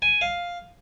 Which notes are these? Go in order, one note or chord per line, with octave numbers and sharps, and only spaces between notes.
G#5
F5